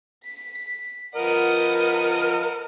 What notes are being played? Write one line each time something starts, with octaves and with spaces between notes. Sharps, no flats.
B6
F3 A#4 B4 D#5 F#5